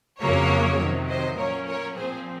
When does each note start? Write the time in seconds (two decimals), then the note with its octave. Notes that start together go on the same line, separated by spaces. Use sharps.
0.20 F2 C#3 F#3 A#3 C#4 A#4 C#5
0.79 C3 D#3 F#3
1.08 C5 D#5
1.37 A#2 F#3 A#3 C#4 A#4 C#5
1.67 A#4 C#5
1.96 A#2 F3 C4 G#4 C5